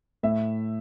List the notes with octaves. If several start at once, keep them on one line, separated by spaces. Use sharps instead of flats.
A2 E5